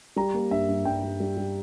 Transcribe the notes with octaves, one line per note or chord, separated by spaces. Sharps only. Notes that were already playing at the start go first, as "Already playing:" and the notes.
G3 A#5
A#3
G2 E5
G2
G2 G5
G3
G3
G3